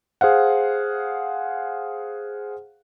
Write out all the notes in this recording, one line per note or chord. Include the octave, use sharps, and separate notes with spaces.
G#4 C5 F5 F#5